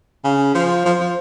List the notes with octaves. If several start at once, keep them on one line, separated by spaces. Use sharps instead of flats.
C#3
F3
F3
F3